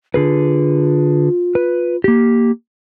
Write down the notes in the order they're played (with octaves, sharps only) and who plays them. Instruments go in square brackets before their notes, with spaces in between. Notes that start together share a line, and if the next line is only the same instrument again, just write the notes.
[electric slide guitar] D3 G#4 B4 [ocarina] F4
[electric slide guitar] B4
A#3 G4